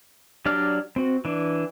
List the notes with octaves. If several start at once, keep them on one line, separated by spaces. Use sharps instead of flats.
F#3 D4 G4 D5 F6
C4 F#4
E3 D4